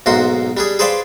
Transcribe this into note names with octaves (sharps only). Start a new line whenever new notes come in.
B1 G#2 A#3 F#4 C6
G3 D4 G#4
G#4 B4 C5 D5 F5 G5